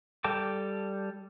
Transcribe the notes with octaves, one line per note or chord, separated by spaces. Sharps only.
G3 A4 G5 A5 D6